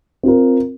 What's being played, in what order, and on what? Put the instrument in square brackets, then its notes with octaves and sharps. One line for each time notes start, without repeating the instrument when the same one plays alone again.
[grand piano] C4 F4 A#4